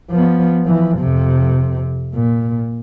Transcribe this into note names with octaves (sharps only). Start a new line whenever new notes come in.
F3 B3
E3 F3
F2 C3
A#2